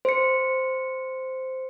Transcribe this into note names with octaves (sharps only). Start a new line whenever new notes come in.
C5 C#7